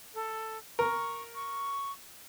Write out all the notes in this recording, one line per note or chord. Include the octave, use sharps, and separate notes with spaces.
A4
A#4 C#6
C#6